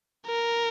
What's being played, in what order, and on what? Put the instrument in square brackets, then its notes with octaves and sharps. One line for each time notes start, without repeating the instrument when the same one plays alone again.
[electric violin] A#4